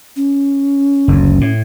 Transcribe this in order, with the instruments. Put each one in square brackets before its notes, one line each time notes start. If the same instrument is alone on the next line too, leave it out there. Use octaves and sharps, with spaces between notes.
[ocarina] C#4
[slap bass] F#1 D2
A2